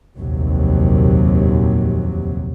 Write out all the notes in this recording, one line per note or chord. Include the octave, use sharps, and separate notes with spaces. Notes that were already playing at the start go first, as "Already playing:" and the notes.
F1 A#1 D#2 C3 F#3